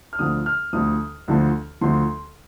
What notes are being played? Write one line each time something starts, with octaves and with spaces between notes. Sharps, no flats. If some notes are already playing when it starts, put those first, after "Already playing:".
F6
D2 D3 F3 D#6
F6
D2 D3 F3 D#6
D2 D3 F3
D2 D3 F3 C6